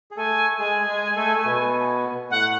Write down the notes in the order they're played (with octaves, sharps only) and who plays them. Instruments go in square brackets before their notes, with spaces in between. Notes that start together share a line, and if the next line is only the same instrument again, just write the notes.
[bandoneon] G#4
[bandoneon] A3 A4 [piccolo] G#5
[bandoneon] G#3 G#4 [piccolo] G#5
[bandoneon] G#3 G#4
A3 A4
A3
B2 B3
[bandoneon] A2 A3 [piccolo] F#5